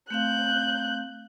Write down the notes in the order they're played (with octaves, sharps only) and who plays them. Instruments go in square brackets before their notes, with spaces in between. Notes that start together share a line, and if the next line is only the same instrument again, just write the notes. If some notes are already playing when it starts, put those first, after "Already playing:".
[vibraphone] A3 C4 F5 [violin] F#6 G6